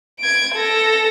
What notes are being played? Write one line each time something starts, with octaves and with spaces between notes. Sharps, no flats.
G#6 D7
A4 A#6